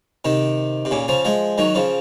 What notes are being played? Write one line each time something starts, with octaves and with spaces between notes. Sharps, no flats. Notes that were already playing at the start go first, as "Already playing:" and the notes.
C3 D#3
C3
A#2 C#3
C#3 F3
F3 G#3
D#3 F#3
C#3 F3